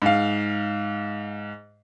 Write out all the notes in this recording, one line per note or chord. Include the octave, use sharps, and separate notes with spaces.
G#2 F5